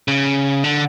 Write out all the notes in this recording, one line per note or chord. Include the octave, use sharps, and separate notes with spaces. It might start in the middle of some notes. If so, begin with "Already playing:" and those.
C#3
D3